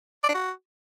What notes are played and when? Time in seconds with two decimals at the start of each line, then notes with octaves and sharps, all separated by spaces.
0.23 D5
0.29 D4
0.34 F#4